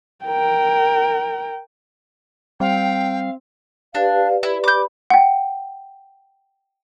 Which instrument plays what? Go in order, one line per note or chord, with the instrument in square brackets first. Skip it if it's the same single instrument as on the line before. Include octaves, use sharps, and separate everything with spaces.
[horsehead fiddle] A#4 G5
[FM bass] G3 [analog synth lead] C4 [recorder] F5 [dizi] G5
[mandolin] D4 [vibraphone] G4 B4 D5 [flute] F5
[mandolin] E4
[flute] B5 [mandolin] D6 G6
[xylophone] F#5 G5